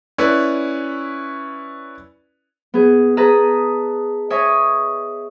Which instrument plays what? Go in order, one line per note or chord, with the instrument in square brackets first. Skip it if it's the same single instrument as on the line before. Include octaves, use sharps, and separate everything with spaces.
[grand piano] C#4 E4 B4 D5
[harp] B3 G#4
G#4 B4 D#5 A5 A#5
C#5 D#5 E5 G#5 C#6 D#6